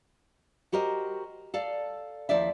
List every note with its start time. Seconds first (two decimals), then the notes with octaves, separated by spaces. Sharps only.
0.72 F#4 G4 A#4 C5 D#5
1.54 A4 D5 F5
2.29 D#2 F3 E4 D5 E5